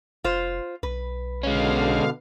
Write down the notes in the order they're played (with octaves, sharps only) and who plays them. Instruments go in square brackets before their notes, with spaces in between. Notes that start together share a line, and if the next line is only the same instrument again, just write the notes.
[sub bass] F1 [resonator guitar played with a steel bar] F4 C5
[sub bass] B1 [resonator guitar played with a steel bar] B4
[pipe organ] B2 D3 F5 [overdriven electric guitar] G#3 C#4